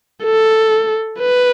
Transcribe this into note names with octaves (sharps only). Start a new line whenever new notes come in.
A4
B4